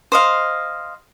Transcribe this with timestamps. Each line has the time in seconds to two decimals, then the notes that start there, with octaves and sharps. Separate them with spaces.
0.12 C5 D#5 F5